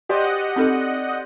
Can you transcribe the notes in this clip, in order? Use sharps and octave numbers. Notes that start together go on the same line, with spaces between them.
G4 C5 D5 D#5 F#5
C4 D#4 A4